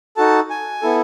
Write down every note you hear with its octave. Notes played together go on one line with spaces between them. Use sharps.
D#4 F#4 A4 A5
G#5
B3 E4 A4